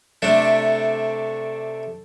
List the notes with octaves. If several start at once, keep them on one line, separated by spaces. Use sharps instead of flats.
C3 A3 D4